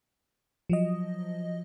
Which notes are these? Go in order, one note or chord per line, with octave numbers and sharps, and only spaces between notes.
F3 F#3 D#5